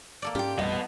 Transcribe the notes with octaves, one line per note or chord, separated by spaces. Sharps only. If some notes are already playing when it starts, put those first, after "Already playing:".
A#3 A4 D5
G#2 C#4 F4 G4 G5
A1 F2 G3 B3 D#5